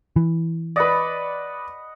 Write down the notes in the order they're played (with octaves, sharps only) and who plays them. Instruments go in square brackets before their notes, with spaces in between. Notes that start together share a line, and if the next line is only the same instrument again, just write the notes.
[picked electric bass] E3
[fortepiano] B4 D5 [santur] D#5 F#5 B5